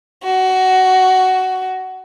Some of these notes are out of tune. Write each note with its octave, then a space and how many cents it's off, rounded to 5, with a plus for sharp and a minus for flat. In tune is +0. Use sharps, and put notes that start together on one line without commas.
F#4 +15